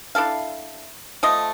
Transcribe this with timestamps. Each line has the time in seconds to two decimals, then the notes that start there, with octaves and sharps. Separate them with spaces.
0.15 D4 E4 A4 F5
1.23 F3 A3 D#5